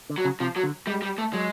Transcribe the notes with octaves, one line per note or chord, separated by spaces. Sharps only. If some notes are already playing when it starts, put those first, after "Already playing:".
D3
F#3
C#3
C3 F3
F#3
D3
G3 G#3
G3
A3
F#3 G#3